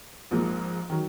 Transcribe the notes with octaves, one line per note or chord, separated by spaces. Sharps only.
A#1 G#2 F3 A#3
D#3 F#3